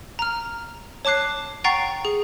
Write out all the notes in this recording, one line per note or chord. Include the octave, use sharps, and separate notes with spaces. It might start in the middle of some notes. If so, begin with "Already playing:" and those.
A#5 F6
C#5 A5 D6 F#6 C7
F#5 G5 A#5 C#6 A6 C7
G#4